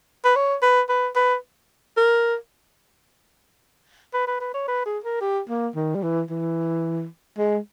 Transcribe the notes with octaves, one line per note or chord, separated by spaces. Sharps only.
B4
C#5
B4
B4
B4
A#4
B4
B4
B4
C#5
B4
G#4
A#4
G4
A#3
D#3
G3
E3
E3
G#3